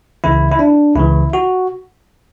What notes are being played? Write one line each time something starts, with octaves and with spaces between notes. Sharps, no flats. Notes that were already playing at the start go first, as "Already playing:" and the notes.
C#2 C#3 E3 E4
E4
D4
C#2 C#3 E3 E4
F#4